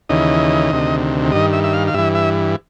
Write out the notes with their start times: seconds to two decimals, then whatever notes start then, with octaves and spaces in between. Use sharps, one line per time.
0.09 D#2 C#3 E3 D#5
0.71 D2 C3 D#3
1.32 G2 D#3 D#5
1.53 E5
1.64 E5
1.73 F5
1.87 F5
1.94 G2 E3 E5
2.15 E5